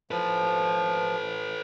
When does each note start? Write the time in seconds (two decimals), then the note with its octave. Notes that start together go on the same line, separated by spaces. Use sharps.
0.11 F3 A4 B4